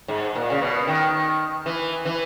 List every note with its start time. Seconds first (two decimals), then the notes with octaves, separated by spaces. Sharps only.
0.08 G#2
0.35 A#2
0.50 C#3
0.61 B2
0.87 D#3
1.66 E3
2.05 E3